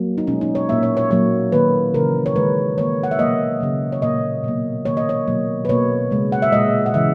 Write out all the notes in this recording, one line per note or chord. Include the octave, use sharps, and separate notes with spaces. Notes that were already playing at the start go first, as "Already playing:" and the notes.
Already playing: F#3 A#3
D#4
B2 G#3 C#4
D#4
C#5
A#2 A#3 E5
C#5
C#5
A#2 F#3 A#3 C#5
D#3 A#3 B4
C#3 E3 A#3 A#4
C#5
D#3 G#3 B4
D#3 A#3 C#5
F#5
E5
B2 F#3 A#3 D#5
C#3 F#3 A#3
C#5
A#2 A#3 D#5
B2 F#3 A#3
D#3 A#3 C#5
D#5
C#5
B2 F#3 A#3
B4
B2 A#3 C#5
C#3 G#3
F#5
E5
A#2 G#3 D#5
F#5
C#3 E3 G#3 E5